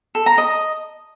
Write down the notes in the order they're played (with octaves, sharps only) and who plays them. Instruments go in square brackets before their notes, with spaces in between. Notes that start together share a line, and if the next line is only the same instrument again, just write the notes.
[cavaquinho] A4
A#5
D#5